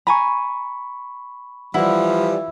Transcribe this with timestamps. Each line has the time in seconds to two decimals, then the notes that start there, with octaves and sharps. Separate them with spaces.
0.07 G#5 A#5 B5 C#6
1.74 E3 F3 G3 E4 F#5